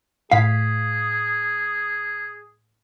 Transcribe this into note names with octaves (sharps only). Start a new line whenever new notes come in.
A2 G#4 F5 B6